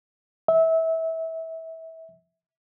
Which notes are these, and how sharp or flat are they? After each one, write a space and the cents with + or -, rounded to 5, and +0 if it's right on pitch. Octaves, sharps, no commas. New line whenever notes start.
E5 -25